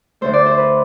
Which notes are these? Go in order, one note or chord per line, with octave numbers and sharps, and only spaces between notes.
D2 D3 A3 C5
D5
C5
B4